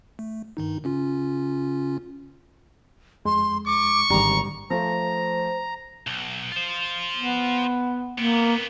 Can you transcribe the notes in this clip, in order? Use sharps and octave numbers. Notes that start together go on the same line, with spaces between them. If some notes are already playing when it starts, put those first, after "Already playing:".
A3
G2 D#3 D#4
C#3 C#4 F4
F2 G#3 C6
C#6 D6
D#1 G#1 G#2 D3 G3 A#5
F3 A3 C5 A#5
B1
F4 C5
B3
C3 A#3 B3